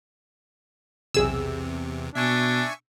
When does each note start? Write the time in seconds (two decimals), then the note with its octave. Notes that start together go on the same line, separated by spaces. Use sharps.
1.14 B1 E2 C3 G#4 E6
2.15 B2 D4 E5 G#5 C#6